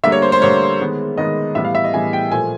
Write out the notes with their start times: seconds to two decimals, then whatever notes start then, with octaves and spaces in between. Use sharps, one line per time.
0.04 D3 G3 A#3 E5
0.12 C#5
0.22 C5
0.32 C5
0.41 D3 G3 A#3 C#5
0.79 D#3 G#3 B3
1.18 D#3 G#3 B3 D#5
1.55 A2 E3 G3 B3 E5
1.65 F5
1.75 E5
1.84 D#5
1.94 A2 E3 G3 B3 G#5
2.13 G5
2.31 A#2 F3 A3 G#5